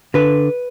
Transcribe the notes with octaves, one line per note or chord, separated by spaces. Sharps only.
D3 B4